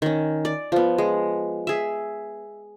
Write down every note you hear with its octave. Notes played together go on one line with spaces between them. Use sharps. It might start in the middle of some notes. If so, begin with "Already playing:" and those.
D#3 C#4
D5
F3 B3
G#3
G#4 E5